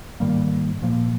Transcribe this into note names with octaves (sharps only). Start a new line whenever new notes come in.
G#2 D#3 G3 A#3
A#2 F3 A#3